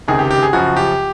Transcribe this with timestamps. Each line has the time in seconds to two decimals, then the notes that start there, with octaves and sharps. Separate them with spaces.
0.08 C#2 C3 D#3 G#4
0.19 G4
0.31 G4
0.42 G#4
0.53 F#2 C#3 F3 F#4
0.76 G4